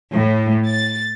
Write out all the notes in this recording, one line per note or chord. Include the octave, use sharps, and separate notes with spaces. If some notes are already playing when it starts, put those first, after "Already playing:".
A2
A6